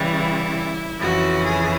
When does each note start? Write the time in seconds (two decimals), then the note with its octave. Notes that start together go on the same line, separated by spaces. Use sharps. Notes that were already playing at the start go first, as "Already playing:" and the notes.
Already playing: C#3 E3 G3
0.12 E4
1.00 F2 C#3 E3 F#4
1.45 G#4